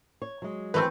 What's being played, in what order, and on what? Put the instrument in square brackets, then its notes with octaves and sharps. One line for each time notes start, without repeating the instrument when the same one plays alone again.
[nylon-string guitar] C#5
F#3 G#3
[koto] E3 A3 C4 [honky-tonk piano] B4